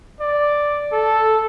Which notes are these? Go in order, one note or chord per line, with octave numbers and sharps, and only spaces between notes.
D5
A4